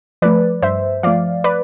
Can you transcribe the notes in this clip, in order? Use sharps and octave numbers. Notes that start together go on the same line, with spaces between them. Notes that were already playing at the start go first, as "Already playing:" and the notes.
F3 A3 B4 D5
G2 C5 E5
F3 A3 D5 F5
B4 D5